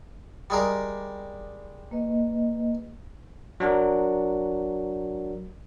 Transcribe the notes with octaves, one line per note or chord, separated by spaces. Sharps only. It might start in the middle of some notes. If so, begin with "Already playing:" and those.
G3 G#3 A#4
A#3 B4 D#5
F#3 D4 F#4 A#4